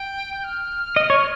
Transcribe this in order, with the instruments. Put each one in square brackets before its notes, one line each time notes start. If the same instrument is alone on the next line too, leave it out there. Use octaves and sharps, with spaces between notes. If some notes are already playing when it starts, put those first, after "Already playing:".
Already playing: [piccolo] G5
G6
F6
[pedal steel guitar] D#5
C#5